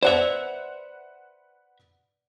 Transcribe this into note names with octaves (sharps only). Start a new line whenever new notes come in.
B4 C5 D5 E5 F#5 F7